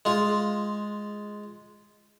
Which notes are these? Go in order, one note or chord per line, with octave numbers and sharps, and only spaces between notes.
G#3 F4